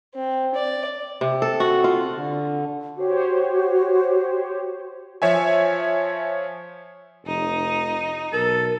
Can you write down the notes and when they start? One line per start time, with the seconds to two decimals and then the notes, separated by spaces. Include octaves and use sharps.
0.15 C4
0.55 D5
1.21 C3
1.42 A4
1.60 F#4
1.84 F4
2.15 D3
2.98 F#4 G4 C5 C#5
5.22 F3 C#5 E5 G#5
7.26 F1 D#4
8.33 B1 A4 A#4